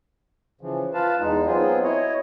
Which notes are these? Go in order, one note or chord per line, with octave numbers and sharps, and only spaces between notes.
C#3 E3 F3
F4 B4 F5 A5
E2 G#3 D#4
F#3 B3 C4 F4 G#4
E4 C#5 D#5